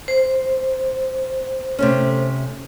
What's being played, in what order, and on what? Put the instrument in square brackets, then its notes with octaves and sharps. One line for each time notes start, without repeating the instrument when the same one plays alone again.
[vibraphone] C5
[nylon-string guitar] C3 A3 C#4